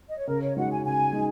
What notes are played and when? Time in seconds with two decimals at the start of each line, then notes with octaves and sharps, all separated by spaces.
0.08 D#5
0.18 C#5
0.27 C#3 A#4
0.42 C#5
0.57 G#3 D#4 F#4 F#5
0.71 G#5
0.84 C#3 G#5
1.13 G#3 D#4